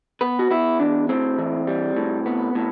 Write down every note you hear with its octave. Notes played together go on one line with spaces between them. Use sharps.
B3 B4
F#4
B3 E4
E2 D4
A2 C4
E3
G3
A2
B3
A2